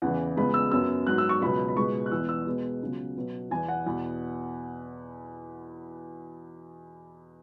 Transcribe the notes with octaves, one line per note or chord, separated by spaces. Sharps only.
E2 C#3 E3 F#5
C#2 C#3 G#3 B3 B5
E6
F#2 F#3 B3 E6
G#2 F#3 B3 F#6
E6
C#6
C#2 B2 F#3 B3 B5
B5
C#2 B2 G#3 B3 C#6
F#6
E2 E3 G#3 B3 E6
E6
B2 G#3 B3
C#2 C#3 F#3 B3
B2 F#3 B3
E2 E3 B3 G#5
F#5
E2 B2 B3